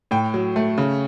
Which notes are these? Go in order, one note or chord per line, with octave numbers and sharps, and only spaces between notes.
A2 G5
F#3
A3
C#3